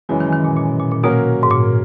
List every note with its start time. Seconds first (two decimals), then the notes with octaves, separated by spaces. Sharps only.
0.09 F#2 C#3 E3 F#3 G#3
0.20 D#3
0.33 D#3
0.44 A#2
0.56 A#2
0.68 B2
0.80 A#2
0.91 A#2
1.03 B2 F#3 A#3 C#4 F#4 A#4
1.43 G#2
1.51 A#2